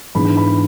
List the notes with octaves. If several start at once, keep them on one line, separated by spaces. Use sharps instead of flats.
G#2 E3 G#3 B3 D4 B5
B5